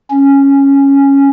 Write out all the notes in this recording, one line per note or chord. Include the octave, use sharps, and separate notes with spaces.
C#4